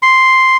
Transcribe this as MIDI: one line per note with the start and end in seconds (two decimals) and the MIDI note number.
0.03 0.57 84